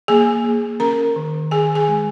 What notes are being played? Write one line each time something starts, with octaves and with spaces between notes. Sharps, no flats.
A#3 G#4 G#5
A#3
C#4 A#4 A#5
D#3
D#3 G#4 G#5
G#4 G#5
G#3